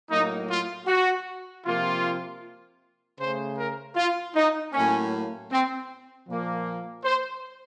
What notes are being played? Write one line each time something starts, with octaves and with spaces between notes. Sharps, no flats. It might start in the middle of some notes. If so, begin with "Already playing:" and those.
A2 F#3 A#3 D#4
F4
F#4
C3 F3 A#3 F4
C#3 A3 C5
A#4
F4
D#4
A2 F#3 A#3 C#4
C4
A#2 F3 A#3
C5